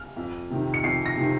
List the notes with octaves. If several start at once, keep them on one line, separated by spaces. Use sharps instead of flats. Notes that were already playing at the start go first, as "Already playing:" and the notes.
Already playing: F6
F2
C3 D#3
C#7
F2 C7
A#6
C3 D#3